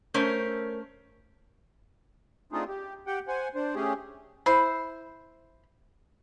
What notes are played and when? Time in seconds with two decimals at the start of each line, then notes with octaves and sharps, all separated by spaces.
0.14 A3 C#4 A#4 C5 C#5
2.52 A3 C4 D4 D#4 F4 G#4
2.68 G4
3.07 G4 F#5 G5
3.28 C5 F#5 G#5
3.55 D4 C5
3.75 A3 C#4 G4 G#4
4.46 E4 C5